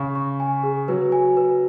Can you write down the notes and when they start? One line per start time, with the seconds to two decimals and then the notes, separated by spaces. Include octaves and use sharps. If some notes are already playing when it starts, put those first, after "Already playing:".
Already playing: C#3 G#4 C#6
0.15 C#6
0.40 G#5
0.63 G#4
0.88 F#3 B4
1.12 G#5
1.37 B4